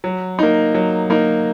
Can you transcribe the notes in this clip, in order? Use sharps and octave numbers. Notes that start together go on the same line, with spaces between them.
F#3
A#3 D#4
F#3
A#3 D#4